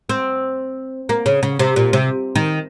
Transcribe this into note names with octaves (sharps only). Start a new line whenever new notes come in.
C4
A#3
C#3
C#3
C3
A#2
C3
D#3